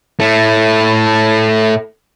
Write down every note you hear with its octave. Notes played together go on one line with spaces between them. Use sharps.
A2 A3